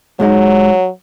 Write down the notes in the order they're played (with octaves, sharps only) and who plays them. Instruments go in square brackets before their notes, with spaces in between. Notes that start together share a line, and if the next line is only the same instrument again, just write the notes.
[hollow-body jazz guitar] G#2 G#3 D#4 [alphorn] F#3